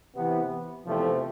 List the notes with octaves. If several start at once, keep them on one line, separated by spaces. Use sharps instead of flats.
C3 E3 B3
E2 C3 F3 A3 C4